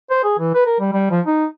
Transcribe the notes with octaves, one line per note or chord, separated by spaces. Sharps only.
C5
G#4
E3
B4
A#4
G3
G3
F3
D#4